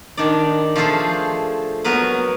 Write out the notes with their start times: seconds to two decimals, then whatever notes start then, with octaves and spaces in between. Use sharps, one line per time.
0.17 D#3 D4 D#4 D5
0.76 F3 A3 F4 G#4 A4 C5
1.84 F#3 B3 A#4 B4